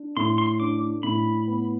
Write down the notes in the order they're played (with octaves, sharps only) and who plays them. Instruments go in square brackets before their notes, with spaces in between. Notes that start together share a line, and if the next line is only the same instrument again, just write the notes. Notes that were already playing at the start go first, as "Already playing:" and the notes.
Already playing: [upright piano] D4
[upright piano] A2 [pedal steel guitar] C6
[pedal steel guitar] C6
[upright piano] D4 [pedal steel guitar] D6
[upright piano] A2 [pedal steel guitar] B5
[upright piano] B3